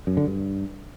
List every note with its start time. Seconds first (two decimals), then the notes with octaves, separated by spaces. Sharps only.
0.07 F#2
0.17 D3
0.27 G2